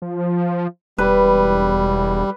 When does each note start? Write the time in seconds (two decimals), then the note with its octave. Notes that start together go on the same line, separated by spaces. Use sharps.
0.02 F3
0.98 E1 G3 B4